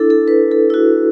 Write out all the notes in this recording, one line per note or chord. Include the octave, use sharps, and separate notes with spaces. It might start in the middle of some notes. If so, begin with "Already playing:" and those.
Already playing: D4 E4 A4
A4
B4
A4
E4
F#4